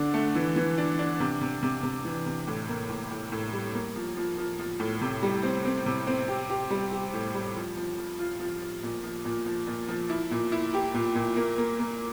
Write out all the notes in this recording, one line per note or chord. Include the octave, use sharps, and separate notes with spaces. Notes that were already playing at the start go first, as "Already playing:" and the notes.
Already playing: D3 D4
A3
E3
E3
D4
D4
C3
C3
C3
C3
E3
C3
A2
A#3
A2
A2
A2
G3
A#3
F3
F3
F3
F3
A2
C3
G3
C4
C4
C3
C4
G4
G4
G3
G4
A2
G3
F3
F3
F3
F4
F3
F3
A#2
F3
A#2
F3
A#2
F3
E4
A#2
E4
G4
A#2
A#2
A#3
A#3
A#3